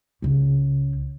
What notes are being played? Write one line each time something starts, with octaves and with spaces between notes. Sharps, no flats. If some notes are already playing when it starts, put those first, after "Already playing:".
C#2 C#3